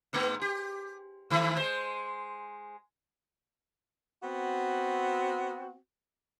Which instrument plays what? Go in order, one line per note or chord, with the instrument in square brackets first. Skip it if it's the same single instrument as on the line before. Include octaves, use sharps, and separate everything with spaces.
[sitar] G#2 A3 B3
G4
D#3 A3
G#3 C5
[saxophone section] B3 C4 F#4